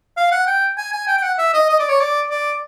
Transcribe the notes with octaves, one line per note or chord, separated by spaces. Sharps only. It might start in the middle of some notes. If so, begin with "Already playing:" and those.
F5
F#5
G5
G#5
G#5
G5
G5
F#5
E5
D#5
D#5
D5
C#5
D5
D5